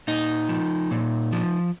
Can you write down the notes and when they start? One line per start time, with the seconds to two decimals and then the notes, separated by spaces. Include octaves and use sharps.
0.08 A#2 D#4
0.49 F3
0.91 A#2
1.32 F3